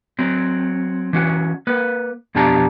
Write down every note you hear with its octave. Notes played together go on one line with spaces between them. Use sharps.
F#3 C4
E3 C#4 F#4
A#3 B4
F2 B2 D4 G4 A5 A#5